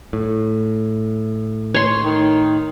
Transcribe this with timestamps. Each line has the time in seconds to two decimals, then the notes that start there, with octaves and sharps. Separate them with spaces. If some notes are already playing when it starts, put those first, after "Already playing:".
0.13 A2
1.74 C#5 C6
2.04 D#3